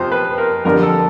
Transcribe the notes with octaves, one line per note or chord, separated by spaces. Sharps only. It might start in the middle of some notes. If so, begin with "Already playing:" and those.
Already playing: F2 C3 F3 C5
B4
A#4
F2 D3 G3 A#4
A4